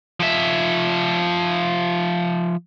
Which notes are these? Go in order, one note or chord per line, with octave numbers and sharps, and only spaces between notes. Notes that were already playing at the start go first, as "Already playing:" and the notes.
F3 E5